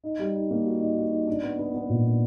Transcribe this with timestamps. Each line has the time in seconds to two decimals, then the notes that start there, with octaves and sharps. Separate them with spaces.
0.04 D#4
0.19 G3
0.34 D#4
0.50 A#3
0.66 F#4
0.81 D#4
0.97 F#4
1.12 D#4
1.27 D4
1.43 B3
1.59 B3
1.74 B3
1.89 A#2
2.05 D4